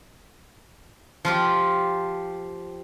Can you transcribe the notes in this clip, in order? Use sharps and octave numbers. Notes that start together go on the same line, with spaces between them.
F3 F4 G4